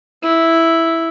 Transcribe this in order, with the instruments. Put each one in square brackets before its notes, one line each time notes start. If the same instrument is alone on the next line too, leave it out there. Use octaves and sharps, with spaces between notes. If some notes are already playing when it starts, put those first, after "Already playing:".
[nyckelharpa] E4